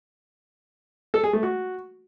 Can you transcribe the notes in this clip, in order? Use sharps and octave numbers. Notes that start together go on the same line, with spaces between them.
A4
G#4
A3
F#4